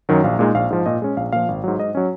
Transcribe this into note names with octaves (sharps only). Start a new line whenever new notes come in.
F#2 D#3 F#3
A#1 F5
A#2 G#3 D#4
A#1 F5
G#2 F3
A#2 D#5
G#3 C#4
A#1 F5
A#2 F3 F5
G#1
G#2 F#3
G#2 D#5
F#3 C#4